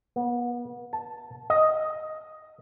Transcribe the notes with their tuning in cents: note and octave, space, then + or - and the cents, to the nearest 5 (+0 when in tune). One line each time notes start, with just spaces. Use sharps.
B3 -35
A5 -5
D#5 +5